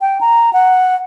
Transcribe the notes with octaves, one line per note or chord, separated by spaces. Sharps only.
G5
A#5
F#5